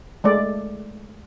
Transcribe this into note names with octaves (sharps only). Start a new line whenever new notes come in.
G#3 A3 D5